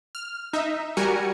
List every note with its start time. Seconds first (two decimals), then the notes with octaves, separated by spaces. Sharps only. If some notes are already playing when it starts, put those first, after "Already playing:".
0.15 F6
0.53 D#4 E5
0.97 G3 F#4 A#4 G#5 C#7